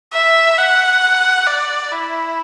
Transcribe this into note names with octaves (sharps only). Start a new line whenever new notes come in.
E5
F#5
D5
E4